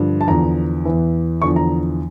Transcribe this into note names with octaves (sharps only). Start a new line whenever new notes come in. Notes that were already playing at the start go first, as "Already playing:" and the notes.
Already playing: G2 D3 F3
A5
E2 D3 F3 A#5
E2 E3
E2 D3 F3 C#6
A#5